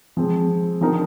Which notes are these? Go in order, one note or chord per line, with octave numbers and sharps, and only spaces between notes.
F3 G#3 C4
D3 F3 C4 D#4 A#4